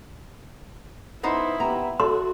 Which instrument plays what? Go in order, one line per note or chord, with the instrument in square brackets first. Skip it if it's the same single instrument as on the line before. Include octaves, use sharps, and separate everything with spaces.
[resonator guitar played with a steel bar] B3 D#4 C5 [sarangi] E4
[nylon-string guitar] B3 G4 [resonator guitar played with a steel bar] A#5
[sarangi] F#4 [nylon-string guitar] A4 [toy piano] C6